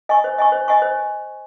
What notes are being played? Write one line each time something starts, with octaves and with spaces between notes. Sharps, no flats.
D#5 G#5 C#6
C5
D#5 G#5 C#6
C5
D#5 G#5 C#6
C5